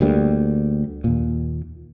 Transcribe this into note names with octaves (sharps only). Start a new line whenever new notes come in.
D2 G3 A#3
D#2 A#2